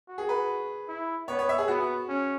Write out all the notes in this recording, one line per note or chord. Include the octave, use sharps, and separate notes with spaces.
F#4
G#4
B4
E4
B3 C#5
C#5
E5
G#4
B3 F#4
C#4